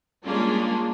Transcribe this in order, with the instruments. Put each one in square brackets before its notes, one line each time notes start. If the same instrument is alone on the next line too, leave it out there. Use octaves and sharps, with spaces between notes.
[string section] G3 G#3 A#3 C#4 D4 F4